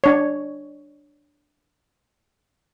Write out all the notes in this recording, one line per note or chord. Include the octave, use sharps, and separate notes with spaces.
D4 C#5